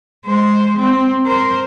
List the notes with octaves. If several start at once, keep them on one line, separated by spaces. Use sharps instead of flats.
G#3 C5
C4
A#4 C5